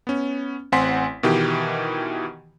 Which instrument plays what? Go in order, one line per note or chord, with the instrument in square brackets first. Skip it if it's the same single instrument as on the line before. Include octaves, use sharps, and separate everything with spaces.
[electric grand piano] B3 C#4
A1 C4 F#5 G#5 C6 B6
B2 D#3 E3 G4